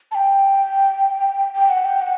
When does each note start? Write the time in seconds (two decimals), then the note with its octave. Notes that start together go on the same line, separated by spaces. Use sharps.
0.11 A5
0.15 G5
1.54 G5
1.69 F#5
1.85 G5
2.02 F#5